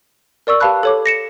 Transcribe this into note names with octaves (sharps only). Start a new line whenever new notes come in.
A#4 D5 C#6 E6
G4 B4 F5 A5 B5 F#6
A4 C#5 D6
A#6 C#7 E7